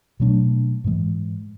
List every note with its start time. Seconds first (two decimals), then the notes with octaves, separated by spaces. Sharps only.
0.20 B2 F#3 A3 D4
0.84 G#2 E3 G#3